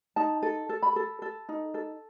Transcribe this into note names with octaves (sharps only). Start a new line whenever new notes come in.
D#4 A5
A4
A4
B5
A4
A4
D#4
A4